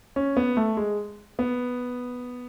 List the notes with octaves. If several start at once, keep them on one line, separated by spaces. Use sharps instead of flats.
C#4
B3
A3
G#3
B3